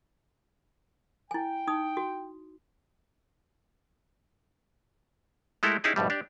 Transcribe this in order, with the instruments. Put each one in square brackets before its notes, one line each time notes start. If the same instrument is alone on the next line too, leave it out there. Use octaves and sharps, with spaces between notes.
[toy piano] E4 G#5 [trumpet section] G5
[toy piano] D#4 D#6
F#4
[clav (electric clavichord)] G#3 A3 E4 G4 A4 A#4
C#4 D#4 E4 G4 G#4 D#5
B1 F2 A2 G3
D4 G4 D5